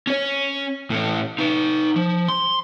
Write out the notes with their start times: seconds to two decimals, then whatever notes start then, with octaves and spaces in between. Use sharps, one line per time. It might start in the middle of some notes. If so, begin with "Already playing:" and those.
0.07 C#4 C#5
0.90 A2 C#4
1.38 D#4 B4
1.96 F3
2.29 C6